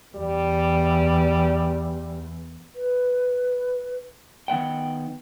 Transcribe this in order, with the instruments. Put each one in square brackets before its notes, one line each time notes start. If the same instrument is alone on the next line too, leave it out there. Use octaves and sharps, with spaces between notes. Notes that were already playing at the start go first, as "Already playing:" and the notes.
[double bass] E2 [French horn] G3
[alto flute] B4
[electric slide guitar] D#3 B3 F#5 G5